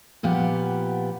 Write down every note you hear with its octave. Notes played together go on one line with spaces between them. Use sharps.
A#2 F3 B3 G4 F#5